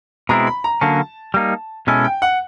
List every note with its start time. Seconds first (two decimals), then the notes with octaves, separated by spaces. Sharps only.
0.29 B2 G#3 C4 E4 A#5
0.47 B5
0.64 A#5
0.81 D3 F#3 A#3 C#4 A5
1.34 G3 A#3 D#4
1.87 B2 G#3 C#4 E4 A4 G#5
2.04 G5
2.22 F#5